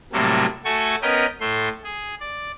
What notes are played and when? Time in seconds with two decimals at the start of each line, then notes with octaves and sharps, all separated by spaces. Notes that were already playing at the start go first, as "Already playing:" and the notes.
0.13 A2 C3 F#3 G3 A3 A#3
0.65 A3 F#4 A4 G#5 C#6
1.02 B3 C#4 A#4 B4 D#5 G5
1.40 A2 A3 C6
1.84 G#4
2.21 D5